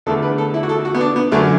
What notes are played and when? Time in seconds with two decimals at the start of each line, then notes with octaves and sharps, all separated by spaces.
0.06 E2 D3 A3 A4
0.22 B4
0.38 A4
0.54 E4
0.63 F#4
0.69 A4
0.85 F#4
0.95 B3
1.01 D4
1.16 B3
1.31 F#2 D3 F#3 A3